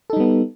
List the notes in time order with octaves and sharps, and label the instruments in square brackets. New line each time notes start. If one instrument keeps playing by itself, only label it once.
[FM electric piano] A4
D#4
G3
B3